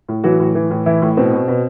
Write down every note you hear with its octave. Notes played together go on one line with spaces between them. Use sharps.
A2
E3 F#3 F#4
A2
E3
A2
E3 E4
A2
B2 C4
B2
B2